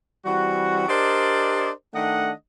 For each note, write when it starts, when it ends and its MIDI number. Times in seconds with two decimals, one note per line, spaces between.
0.26 0.84 52
0.26 0.84 55
0.26 0.84 60
0.26 0.84 66
0.89 1.71 62
0.89 1.71 67
0.89 1.71 70
0.89 1.71 72
0.89 1.71 74
0.89 1.71 75
1.94 2.31 51
1.94 2.31 57
1.94 2.31 62
1.94 2.31 75
1.94 2.31 78